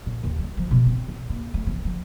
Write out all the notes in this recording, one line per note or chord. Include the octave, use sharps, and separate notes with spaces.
A#2
D#2
G3
F3
B2
C4
A1
A#3
A3
E3
F3